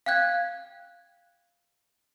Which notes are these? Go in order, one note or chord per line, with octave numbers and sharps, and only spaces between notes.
F5 G5 F#6 G#6